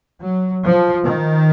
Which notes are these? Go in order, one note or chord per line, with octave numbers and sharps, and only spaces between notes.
F#3
F3
D#3